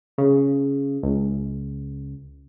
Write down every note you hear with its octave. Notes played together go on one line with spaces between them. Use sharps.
C#3
C#2